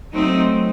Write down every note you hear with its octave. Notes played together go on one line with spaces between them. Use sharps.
F#3 A3 C4 D#4